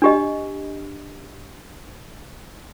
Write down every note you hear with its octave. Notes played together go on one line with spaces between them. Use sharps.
D4 G4 D#5